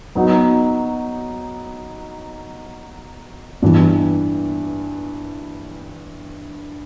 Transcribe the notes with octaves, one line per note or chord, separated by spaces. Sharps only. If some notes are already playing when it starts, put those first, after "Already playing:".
F#3 B3 D#4
G2 E3 G3